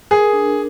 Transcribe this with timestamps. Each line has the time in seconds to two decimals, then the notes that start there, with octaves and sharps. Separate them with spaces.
0.11 G#4 A#4
0.33 D4